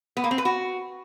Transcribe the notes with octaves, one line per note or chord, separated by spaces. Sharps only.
B3
A#3
C4
B4
F#4